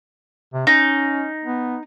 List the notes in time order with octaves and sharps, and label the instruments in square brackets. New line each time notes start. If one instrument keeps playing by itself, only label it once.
[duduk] C3
[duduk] C#4 [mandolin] D#4
[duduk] B3